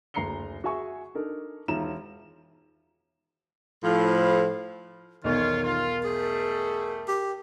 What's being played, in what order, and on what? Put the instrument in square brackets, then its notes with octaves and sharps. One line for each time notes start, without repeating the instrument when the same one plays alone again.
[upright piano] F#1 D2 A#5 C7 C#7 G7
F#4 G#4 E5 G#5 C#6
D4 D#4 A4 A#4
E1 D#3 F4 E5 A#5 E7
[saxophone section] A2 F3
[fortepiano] B1 E2 [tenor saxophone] D#3 [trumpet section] F4 C#5 [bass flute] A#4
[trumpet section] F4
[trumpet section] G3 A3 [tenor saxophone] G#4
[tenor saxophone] G4